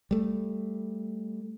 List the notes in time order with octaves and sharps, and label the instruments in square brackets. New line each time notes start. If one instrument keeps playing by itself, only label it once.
[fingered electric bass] G3 A3